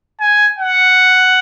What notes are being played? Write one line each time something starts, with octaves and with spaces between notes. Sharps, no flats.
G#5
F#5